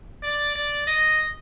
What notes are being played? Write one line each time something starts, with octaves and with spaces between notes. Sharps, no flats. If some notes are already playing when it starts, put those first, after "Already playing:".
D5
D5
D#5